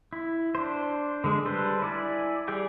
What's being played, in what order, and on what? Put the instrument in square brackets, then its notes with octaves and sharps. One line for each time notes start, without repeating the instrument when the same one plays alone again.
[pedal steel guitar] E4
D4 C5
D3 G#3
G3 A4 B4 C5
E4 D5 G#5
G3 G4 G#4 D5 G5